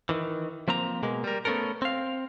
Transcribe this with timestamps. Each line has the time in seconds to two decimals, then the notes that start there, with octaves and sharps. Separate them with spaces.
0.09 D#3 E3
0.68 F3 A#3 C4 A#5
1.03 B2 G#3 A#3
1.24 G3 A#4
1.45 A3 B3 C#4 A4 A#4
1.82 C4 F5